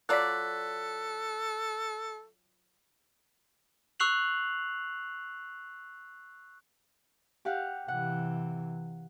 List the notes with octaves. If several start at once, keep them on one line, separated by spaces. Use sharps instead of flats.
F#3 F4 A4 D5 F#6 B6
C#6 E6 F#6 C7 F7 F#7
G4 F5 F#5
C3 E3 F#5